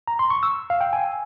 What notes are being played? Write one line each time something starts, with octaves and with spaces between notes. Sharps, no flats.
A#5
C6
C#6
E6
F5
G5
G#5